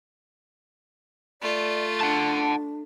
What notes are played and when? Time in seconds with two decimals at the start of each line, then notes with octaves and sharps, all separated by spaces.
1.42 A3 F4 D5
2.01 D4 F#5 A5